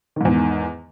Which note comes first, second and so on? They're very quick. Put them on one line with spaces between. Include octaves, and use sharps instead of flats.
D#3 G#2 E2